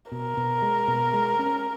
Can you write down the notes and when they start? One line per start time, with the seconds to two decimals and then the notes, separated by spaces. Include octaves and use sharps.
0.12 B2 A#4
0.37 B2
0.62 G#3
0.88 B2
1.13 G#3
1.39 C#4